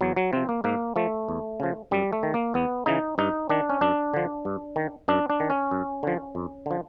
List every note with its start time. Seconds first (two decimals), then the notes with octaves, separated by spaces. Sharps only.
0.01 E2 F#3
0.16 F#3
0.33 C3 F3 C4
0.49 A#3
0.64 G#2 A#3
0.96 F3 A3
1.29 E2
1.60 C#3 F3
1.91 F#2 G3
2.13 A3
2.23 D#3
2.34 A#3
2.54 E2 B3
2.86 C#3 E3 D#4
3.18 G2 D#4
3.49 D#3 D4
3.70 C#4
3.81 F#2 D4
4.14 D3 F3
4.45 G2
4.76 D#3
5.08 F#2 D4
5.30 D4
5.40 D#3
5.50 C#4
5.71 F#2
6.03 D3 F3
6.35 F2
6.66 D3 F3